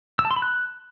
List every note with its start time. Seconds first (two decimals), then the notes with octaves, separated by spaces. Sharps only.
0.19 E6
0.25 A5
0.31 C6
0.36 B5
0.42 F#6